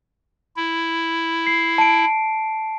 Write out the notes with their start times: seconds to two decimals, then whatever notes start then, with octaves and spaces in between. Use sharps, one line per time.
0.56 E4
1.47 C7
1.78 A5 D7